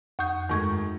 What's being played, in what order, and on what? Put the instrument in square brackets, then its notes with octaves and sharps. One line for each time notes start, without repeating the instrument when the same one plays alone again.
[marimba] F2 G6 [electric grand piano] F#5 C#6 D#6
[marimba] G2 C#6 G#6 [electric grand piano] D#3 G#3 A3